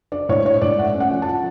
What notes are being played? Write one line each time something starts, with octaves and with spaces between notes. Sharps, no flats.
D4 D5
A2 C#5
D4 C#5
A2 D5
A3 F#5
C#4
F#5
F3
A5
F3